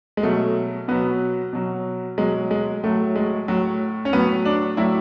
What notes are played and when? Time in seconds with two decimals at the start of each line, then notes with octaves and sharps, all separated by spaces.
0.17 G#3
0.23 B2 F#3 A3
0.88 B2 F#3 B3
1.53 B2 F#3
2.18 B2 F#3 G#3
2.51 G#3
2.83 A2 F#3 A3
3.16 G#3
3.48 A2 F#3
4.05 C#4
4.13 A2 F#3 B3
4.45 D4
4.77 A2 F#3 E4